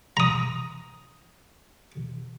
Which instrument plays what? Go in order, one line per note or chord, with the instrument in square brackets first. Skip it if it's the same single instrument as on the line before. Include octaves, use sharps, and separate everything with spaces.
[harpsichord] A#5 D#6